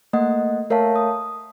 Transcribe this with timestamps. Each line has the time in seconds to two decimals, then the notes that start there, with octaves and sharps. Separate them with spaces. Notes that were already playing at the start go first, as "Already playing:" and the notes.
0.13 A3 A#3 D#5 F#5
0.70 A3 A#4 C#5 E5 F5 A5
0.96 D#6